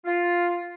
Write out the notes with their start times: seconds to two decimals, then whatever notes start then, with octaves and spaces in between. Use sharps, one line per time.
0.06 F4